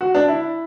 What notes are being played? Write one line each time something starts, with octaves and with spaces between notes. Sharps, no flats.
F#4
D4
E4